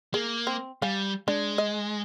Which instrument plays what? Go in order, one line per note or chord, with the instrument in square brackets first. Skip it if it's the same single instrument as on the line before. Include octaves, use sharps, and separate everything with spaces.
[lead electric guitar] A#3 [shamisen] G#4
[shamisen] C4
[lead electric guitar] G3 [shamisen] F5 G#5
[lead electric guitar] G#3 [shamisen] D4
[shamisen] D#5